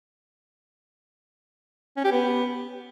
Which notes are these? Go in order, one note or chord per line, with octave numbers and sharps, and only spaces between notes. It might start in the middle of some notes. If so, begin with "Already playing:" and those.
C#4
G4
B3